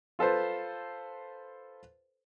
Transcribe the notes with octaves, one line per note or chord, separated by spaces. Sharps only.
F4 A4 B4 C5